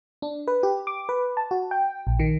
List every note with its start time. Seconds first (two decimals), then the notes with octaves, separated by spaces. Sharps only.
0.22 D4
0.47 B4
0.63 G4
0.87 D6
1.09 B4
1.37 A5
1.51 F#4
1.71 G5
2.07 A#1
2.19 D#3